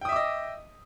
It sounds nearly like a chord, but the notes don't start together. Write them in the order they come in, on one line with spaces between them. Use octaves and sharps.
G5 D#6 E5 D6 D#5